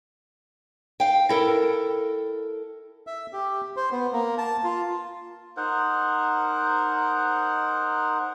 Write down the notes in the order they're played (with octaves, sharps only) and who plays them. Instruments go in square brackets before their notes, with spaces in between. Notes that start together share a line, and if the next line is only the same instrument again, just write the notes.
[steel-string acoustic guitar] F5 G5
E4 A4 A#4
[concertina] E5
G4
C5
B3
A#3
A5
F4
[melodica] D#4 A#4 C5 F#5